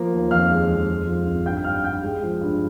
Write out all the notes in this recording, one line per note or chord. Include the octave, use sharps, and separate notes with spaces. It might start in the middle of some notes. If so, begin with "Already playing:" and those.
Already playing: F3 A#3
D#2
F2 F5 F6
G#3
F2
G#3
F3
G#1
G2 G5 G6
G6
G3 F5 F6
G2 G5 G6
G#3
F3
G2